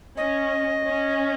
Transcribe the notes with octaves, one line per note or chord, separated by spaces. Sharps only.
C#4 D#5
C#4